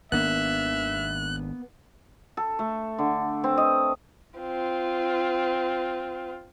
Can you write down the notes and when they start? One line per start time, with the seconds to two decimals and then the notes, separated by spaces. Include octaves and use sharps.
0.12 G#1 D#3 A#3 B3 D4 E5 F#6
2.37 A4
2.59 A3
2.98 D3
3.44 C4
3.58 D#5
4.40 C4 F4